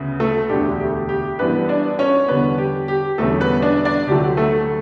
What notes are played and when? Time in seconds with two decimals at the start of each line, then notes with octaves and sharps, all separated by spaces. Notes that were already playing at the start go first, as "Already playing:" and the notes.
Already playing: D2 C#3 B3
0.20 A3 A4
0.49 E1 D2 D3 A3 D4 G4
0.80 G4
1.09 G4
1.39 F#2 E3 G3 B3 D4 B4
1.69 D4 D5
1.99 C#4 C#5
2.28 E2 D3 G3 B3 D4 B4
2.58 G4
2.88 G4
3.18 E1 E2 D3 G3 A3 C#4 A4
3.40 B3 B4
3.62 D4 D5
3.85 D4 D5
4.07 D2 D3 F#3 A3 G4
4.37 A3 A4